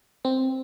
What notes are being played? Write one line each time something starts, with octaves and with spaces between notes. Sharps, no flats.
C4